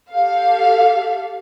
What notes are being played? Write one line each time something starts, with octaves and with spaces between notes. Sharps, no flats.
G4 A4 F5